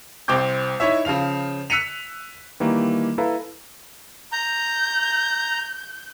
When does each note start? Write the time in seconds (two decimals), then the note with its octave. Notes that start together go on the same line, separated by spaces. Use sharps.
0.28 C2 C4 G5 D6 G6
0.80 E3 D#4 E4 C#5 E5
1.05 C#3 F3 F5 F7
1.70 E6 F#6 B6 C#7 D#7 F7
2.60 D#3 E3 G3 A#3
3.18 E4 A4 B4 F5 A#5
4.32 A#5 G6